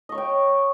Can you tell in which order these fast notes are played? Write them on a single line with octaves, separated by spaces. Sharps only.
D#5 C#6 C#5 G5